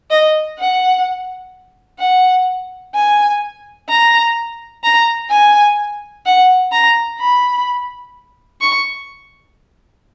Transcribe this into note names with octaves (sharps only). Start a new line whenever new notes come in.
D#5
F#5
F#5
G#5
A#5
A#5
G#5
F#5
A#5
B5
C#6